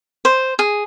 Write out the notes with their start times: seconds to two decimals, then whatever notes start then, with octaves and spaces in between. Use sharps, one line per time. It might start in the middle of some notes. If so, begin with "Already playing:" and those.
0.25 C5
0.59 G#4